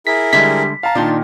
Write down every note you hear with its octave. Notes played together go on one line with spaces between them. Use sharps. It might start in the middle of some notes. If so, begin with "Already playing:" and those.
E4 G#4 A#4 B6
D3 G3 G#3 E5 B6
F5 A5 A#5
A#2 D#3 D4 D#4 F4